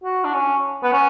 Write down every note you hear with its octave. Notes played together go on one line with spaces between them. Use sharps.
F#4
D4
C#4
B3
C#4